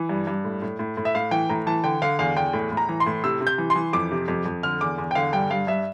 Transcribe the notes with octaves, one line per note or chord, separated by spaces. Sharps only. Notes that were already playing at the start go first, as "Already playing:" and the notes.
Already playing: E3
G2
G2
A2
A2
A2
A2
E5
A2 F5
E3 G5
A2 A#5
E3 A5
D3 G5
D3 F5
E2 F5
E2 G5
A2
A2
A#5
E3
C6
A2
C3 E6
C3
G6
E3
C6
E3
F2 D6
C3
F2
F2
D3 F6
E2 D6
E2
G5
D3 F5
G2 G5
G2 F5
G2 E5